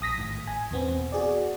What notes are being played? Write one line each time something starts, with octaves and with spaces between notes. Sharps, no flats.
A#1 D#6 A#6 B6
G#1 A2
G#5
E2 B2 B3 C4
F#4 G#4 D5